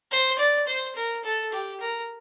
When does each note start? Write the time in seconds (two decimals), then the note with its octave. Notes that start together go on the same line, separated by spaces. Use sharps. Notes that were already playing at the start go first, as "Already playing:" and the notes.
0.11 C5
0.38 D5
0.67 C5
0.95 A#4
1.24 A4
1.52 G4
1.81 A#4